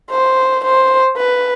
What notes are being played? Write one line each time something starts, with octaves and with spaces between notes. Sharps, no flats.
C5
C5
B4